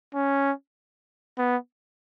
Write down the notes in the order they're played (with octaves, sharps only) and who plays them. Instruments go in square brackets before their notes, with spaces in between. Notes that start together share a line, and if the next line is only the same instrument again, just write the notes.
[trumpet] C#4
B3